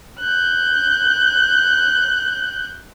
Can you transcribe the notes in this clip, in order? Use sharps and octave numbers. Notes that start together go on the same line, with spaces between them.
F#6 G6